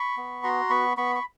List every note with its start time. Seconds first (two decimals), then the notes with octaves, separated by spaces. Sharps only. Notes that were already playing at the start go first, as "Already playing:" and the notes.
Already playing: B5 C#6
0.17 B3
0.44 F#4 A#5 C6
0.70 B3 B5 C#6
0.97 B3 B5 C#6
1.15 C#6